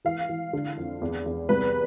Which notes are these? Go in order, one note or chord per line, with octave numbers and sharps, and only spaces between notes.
E3 F5
E3
D3
F2
E2
E2
C2 B4